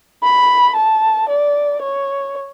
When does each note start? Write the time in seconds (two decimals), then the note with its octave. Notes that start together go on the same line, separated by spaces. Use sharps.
0.23 B5
0.76 A5
1.29 D5
1.82 C#5